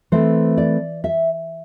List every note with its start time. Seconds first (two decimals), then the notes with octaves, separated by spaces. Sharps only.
0.12 E3 A3 C4 C5
0.58 D5
1.04 E5